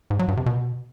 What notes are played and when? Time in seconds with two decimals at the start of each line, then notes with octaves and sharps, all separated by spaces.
0.10 G#2
0.19 F#3
0.28 G2
0.37 C3
0.46 B2